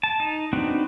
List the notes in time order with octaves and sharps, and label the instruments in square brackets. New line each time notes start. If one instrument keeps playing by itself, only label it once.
[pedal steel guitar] A5
D#4
C4 D4 D#4 F#4 B4